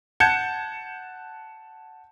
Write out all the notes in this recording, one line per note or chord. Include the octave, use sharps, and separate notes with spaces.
F#5 A5 G6 G#6 C#7